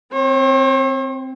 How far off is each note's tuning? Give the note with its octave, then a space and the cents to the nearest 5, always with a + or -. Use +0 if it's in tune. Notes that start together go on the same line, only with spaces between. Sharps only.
C4 +0 C#5 -45